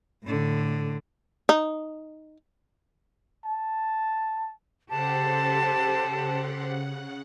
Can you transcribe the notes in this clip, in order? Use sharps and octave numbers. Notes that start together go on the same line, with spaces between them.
A2 D3
D#4
A5
C#3 G4 A4 C5 F#5 A5